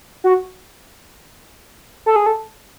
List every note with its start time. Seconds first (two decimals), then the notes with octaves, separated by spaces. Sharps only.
0.24 F#4
2.06 A4
2.16 G#4
2.26 A4